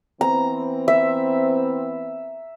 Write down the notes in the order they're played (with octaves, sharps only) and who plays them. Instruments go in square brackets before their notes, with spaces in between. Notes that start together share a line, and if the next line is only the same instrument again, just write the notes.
[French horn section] E3 B3 C4 [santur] A#5
[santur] E5